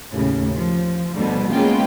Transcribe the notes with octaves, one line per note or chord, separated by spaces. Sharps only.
D#2 A2 C#3
F3
D2 B2 D3 G3
G#3 A#3 B3 C#4 F4 G5